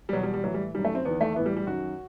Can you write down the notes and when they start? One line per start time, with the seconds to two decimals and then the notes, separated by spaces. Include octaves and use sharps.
0.09 G3
0.13 E2 B2 F#3
0.23 G3
0.34 G3
0.44 A2 E3 F#3
0.54 G3
0.74 D#3 G3
0.79 F#2
0.85 A3
0.95 C4
1.05 E2 D#3 B3
1.21 A3
1.36 E3 B3
1.39 A2
1.46 G3
1.57 G3
1.67 F#2 D#3 F#4